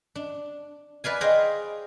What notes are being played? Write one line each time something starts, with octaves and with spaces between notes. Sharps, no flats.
D4
B4 D5 F5 G#5
G#4 C5 D#5 F5 G5